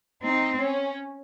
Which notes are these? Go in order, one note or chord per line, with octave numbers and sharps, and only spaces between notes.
C4 D#4
C#4